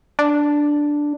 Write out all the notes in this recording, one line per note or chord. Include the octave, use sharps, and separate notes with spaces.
D4